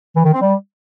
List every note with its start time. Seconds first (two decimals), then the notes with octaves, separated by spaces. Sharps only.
0.16 E3
0.25 D#3
0.33 C4
0.42 G3